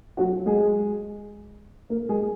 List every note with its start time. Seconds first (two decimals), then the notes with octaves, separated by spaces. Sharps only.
0.17 F#3 F#4
0.46 G#3 G#4
1.90 A#3 A#4
2.09 G#3 G#4